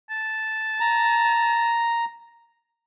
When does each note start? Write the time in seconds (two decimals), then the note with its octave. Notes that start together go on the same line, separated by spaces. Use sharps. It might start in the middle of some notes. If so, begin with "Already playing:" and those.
0.10 A5
0.80 A#5